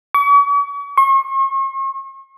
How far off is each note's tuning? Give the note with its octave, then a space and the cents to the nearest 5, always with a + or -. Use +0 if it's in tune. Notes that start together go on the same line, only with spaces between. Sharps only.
C#6 +45
C#6 -45